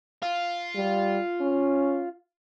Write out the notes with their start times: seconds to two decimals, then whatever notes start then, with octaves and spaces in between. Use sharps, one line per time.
0.23 F4
0.76 G3
1.41 C#4